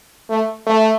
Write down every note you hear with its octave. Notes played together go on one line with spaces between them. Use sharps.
A3
A3